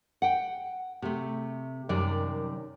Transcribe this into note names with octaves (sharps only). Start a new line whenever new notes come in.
F#5 G5
C3 A3
F#2 C3 D#3 G3 D5